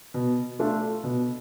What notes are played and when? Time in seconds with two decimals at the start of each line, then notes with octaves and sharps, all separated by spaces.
0.14 B2
0.59 A3 D4 F4
1.04 B2